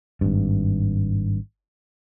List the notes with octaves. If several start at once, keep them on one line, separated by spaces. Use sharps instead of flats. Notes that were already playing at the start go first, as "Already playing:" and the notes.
G#1 G2